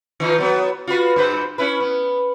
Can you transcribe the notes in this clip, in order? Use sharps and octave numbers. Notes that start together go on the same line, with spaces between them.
D#3 D#4 F4
F#3 B3
F4 F#4 B4
G2 B4 C5
C#4 E4 B4
B3